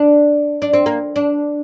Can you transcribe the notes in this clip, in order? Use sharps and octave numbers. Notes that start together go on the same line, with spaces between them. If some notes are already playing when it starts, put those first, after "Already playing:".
Already playing: D4
D4
C4
A#3
D4